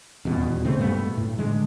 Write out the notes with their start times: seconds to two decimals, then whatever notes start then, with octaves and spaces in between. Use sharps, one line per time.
0.25 D#1 E2 B2
0.64 C#3 A3 C4
0.78 G2 B2 A3 B3
1.17 A2
1.38 D3 G#3